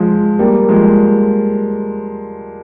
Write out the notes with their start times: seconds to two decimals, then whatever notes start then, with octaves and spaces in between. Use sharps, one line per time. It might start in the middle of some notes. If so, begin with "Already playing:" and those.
Already playing: F3 G#3
0.39 G3 A#3
0.69 F3 G#3